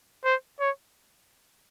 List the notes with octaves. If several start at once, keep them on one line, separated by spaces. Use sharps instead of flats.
C5
C#5